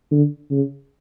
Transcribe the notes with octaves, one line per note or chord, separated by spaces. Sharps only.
D3
C#3